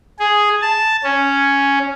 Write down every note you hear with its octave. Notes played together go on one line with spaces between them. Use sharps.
G#4
A5
C#4